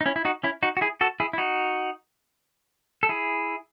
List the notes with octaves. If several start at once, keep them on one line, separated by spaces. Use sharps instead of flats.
D#4
C#4 E4
E4
D#4 F#4
C#4 E4
D#4 F#4
F#4
E4 G#4
F#4 A4
E4 G#4
E4
D#4 F#4
A4
E4 G#4